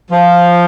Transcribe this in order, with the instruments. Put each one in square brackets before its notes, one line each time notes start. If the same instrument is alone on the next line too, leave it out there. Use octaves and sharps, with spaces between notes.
[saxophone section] F3